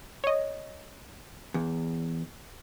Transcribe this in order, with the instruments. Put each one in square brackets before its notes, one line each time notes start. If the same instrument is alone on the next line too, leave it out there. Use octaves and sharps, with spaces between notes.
[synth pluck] C#5 D#5
[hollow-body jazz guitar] E2